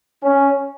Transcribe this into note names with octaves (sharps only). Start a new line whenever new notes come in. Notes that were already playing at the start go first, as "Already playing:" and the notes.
C#4